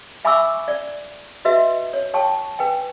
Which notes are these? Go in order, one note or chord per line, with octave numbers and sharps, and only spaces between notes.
E5 G#5 B5 C#6 D6 E6
D5
F#4 B4 D#5 E5
C#5
C#5 G5 A5 C#6
B4 G5 G#5